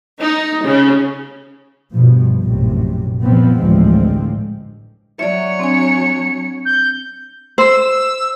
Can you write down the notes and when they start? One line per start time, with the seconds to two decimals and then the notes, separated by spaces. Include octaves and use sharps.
0.20 D#4
0.65 C#3
1.93 G2 B2 F3
2.42 A#1 F#2 A2 C3
3.21 A#2 F3 B3 C4
3.57 A1 D2 D3 F3 G#3 C4
5.19 F#3 C#5 D5 E5 C#7
5.59 C4 D4 G#5
6.65 G6
7.58 C5 E6